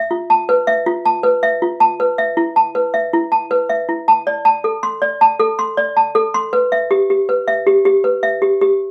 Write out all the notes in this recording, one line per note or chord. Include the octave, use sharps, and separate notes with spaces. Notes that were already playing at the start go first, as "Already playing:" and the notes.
Already playing: E5
F4
A5
B4
E5
F4
A5
B4
E5
F4
A5
B4
E5
E4
A5
B4
E5
E4
A5
B4
E5
E4
A5
D5
A5
A4
C6
D5
A5
A4
C6
D5
A5
A4
C6
B4
E5
G4
G4
B4
E5
G4
G4
B4
E5
G4
G4